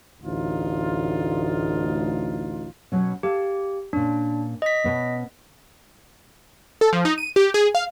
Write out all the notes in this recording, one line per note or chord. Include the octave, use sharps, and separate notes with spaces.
A1 D2 D#4 F4
B2 F#3 C#4
G4 A4 F5
A#2 C#4 D4
D#5 B6
B2 B3 C#4
A4
F3
D#4
D#7
G4
G#4
F5